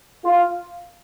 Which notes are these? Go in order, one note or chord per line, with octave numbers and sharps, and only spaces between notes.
F4